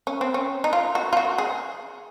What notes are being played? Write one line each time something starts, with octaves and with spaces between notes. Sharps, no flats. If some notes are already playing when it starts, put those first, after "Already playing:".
C#4
C4
C#4
D#4
F4
F#4
F4
F#4
G#4